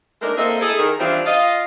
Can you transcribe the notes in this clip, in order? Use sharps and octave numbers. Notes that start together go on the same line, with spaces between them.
G#3 A3 D4 D#4 A#4
A#3 C4 A4 A#4 D#5 E5
E4 G#4 A4
D#3 G#4
E3 G3 C4 D4 E4 F4
F4 D#5